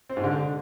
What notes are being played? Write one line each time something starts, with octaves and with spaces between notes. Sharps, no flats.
C4
G#2
D3